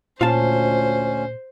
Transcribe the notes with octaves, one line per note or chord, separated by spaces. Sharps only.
D2 A#2 C#4 F4 C5 F5 A5